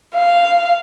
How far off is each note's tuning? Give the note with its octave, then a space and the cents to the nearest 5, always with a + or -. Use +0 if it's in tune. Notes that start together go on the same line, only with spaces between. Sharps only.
F5 -10